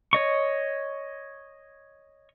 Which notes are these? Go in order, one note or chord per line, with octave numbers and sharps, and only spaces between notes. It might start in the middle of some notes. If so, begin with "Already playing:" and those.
C#5 D#5 C#6